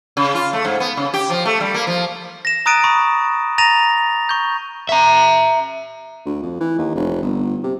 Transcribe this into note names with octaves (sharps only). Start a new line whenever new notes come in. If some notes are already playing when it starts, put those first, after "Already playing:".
C#3
F4
A3
G#2
B3
C#3
G4
F3
A3
G3
A#3
F3
A#6 E7
A#5 D#6 F#6 A6 D7 D#7
B5 C#6 D#6
A#5 A6 A#6 D#7 F7
C#6 G6
E5 A#5
D2
F2
E3
D#2
F1
G1
C3